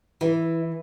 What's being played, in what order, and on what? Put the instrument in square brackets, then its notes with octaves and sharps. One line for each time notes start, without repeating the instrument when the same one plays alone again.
[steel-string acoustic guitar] E3 [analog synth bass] E4